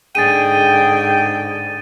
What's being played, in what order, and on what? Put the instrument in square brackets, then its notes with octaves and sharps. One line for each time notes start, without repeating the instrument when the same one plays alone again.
[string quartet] G#2 D3 [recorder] G#4 [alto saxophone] G5 [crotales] A6 D#7